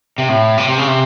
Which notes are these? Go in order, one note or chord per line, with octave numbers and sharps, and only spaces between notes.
C3
A2
C3
C3
C#3
C3